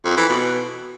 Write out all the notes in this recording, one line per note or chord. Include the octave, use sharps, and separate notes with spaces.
F2
E3
B2